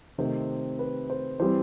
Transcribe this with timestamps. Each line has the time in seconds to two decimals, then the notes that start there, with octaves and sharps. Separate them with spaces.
0.18 C3 D#3 A3 C4 C5
0.79 B4
1.10 C5
1.40 E3 G3 C4 C5